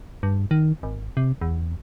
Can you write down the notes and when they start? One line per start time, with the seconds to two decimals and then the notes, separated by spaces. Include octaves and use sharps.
0.23 G2
0.51 D#3
0.83 G#1
1.17 C3
1.41 E2